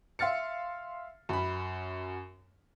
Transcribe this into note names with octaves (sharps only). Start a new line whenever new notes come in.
E5 F5 C6 F6 A6 C#7
F#2 B5